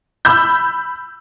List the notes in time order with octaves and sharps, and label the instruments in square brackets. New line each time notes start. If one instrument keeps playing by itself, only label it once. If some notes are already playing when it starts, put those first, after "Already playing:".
[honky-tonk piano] B5 E6 G6